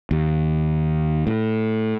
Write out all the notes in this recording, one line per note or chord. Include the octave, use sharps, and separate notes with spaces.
D#2
A2